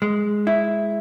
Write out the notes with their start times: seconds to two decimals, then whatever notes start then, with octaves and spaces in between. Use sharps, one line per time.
0.02 G#3
0.47 E4